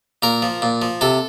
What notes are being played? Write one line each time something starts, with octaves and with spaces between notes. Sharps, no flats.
A#2 A#4
F3
A#2
F3
C3 A4